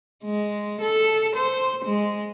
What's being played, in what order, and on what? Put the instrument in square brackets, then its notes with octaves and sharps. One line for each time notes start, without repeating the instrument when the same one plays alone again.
[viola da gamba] G#3
A4
C5
G#3